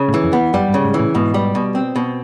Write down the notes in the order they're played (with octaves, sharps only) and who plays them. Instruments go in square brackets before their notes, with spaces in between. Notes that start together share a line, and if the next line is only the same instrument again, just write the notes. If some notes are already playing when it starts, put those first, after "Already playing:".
Already playing: [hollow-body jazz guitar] C#3
[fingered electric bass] A2
[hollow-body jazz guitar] E3
[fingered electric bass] F2
[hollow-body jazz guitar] B3
[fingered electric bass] F#2 [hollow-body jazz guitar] G3
[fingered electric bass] G2
[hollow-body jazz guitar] C#3
[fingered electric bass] G#2
[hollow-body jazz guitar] E3
[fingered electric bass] A2
[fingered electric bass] G#2 [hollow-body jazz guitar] B2
[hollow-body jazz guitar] G3
B2
C4
B2